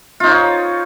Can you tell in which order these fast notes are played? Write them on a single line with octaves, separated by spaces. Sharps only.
F4 D#4 C#5